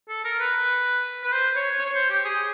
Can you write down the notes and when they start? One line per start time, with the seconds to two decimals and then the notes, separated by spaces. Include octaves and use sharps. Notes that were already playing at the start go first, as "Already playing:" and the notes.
0.09 A4
0.25 A#4
0.39 B4
1.23 B4
1.32 C5
1.56 C#5
1.78 C#5
1.95 C5
2.10 G4
2.24 G#4